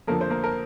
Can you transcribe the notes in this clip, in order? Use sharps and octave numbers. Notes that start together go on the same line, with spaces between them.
F2 D3 F3 A#3 A#4
C5
A#3 A#4
A#4